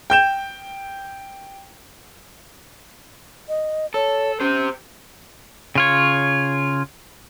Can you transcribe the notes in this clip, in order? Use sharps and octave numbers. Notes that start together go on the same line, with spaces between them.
G5 G6 E7
D#5
A4 C#5
C#4 G4 C5
C#3 F4 C#5